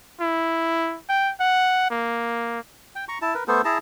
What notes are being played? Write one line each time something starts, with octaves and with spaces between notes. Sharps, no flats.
E4
G5
F#5
A#3
G5
A#5 C#6
E4 A5
A#4 B4
A3 B3 A4 C5
E4 G#4 A5 A#5